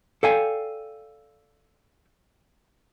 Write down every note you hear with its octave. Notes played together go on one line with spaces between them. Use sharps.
A4 D5 F5 G5 G#5